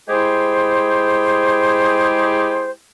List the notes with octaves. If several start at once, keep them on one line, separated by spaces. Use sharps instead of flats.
G#3 E4 G4 G#4 C5